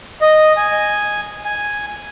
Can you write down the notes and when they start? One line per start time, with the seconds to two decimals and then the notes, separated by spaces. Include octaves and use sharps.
0.21 D#5
0.57 G#5
1.45 G#5